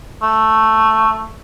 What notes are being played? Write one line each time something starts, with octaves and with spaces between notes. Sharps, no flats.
A3